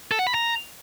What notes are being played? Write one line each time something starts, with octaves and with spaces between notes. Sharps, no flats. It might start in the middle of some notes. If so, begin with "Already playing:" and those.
A4
F#5
B5
A#5